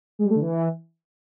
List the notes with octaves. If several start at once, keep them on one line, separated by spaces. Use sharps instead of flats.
G#3
G3
A3
D3
E3